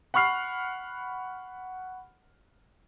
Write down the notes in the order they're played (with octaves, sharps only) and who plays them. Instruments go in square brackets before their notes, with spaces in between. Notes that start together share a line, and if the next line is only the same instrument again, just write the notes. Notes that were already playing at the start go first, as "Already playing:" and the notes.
[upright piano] F#5 B5 C#6 F6 C7